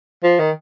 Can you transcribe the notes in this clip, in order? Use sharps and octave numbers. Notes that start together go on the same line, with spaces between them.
F3
D#3